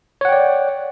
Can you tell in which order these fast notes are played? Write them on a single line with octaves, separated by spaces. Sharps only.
C#5 F#5 G5 D5